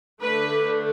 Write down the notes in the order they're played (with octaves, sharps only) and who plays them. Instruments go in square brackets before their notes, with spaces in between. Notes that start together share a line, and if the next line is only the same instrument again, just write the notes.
[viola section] D3 A3 D4 B4